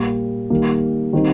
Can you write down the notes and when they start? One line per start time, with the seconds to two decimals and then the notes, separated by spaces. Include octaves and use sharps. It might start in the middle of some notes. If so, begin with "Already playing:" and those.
Already playing: A#2 G3 A#3
0.50 D#3 G3 A#3
1.13 D#3 G3 C4 D#4